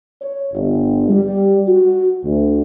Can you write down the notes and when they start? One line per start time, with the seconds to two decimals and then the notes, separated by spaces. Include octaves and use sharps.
0.21 C#5
0.53 G1
1.09 G3
1.67 F#4
2.24 D2